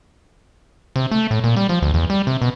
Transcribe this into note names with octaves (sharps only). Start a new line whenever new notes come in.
C3
A3
A2
A#2
G3
F3
D2
E2
G3
C3
B2